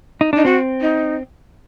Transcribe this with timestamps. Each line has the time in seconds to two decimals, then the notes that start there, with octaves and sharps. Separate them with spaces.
0.21 D#4
0.33 D4 D#4
0.45 C4 F#4
0.81 D#4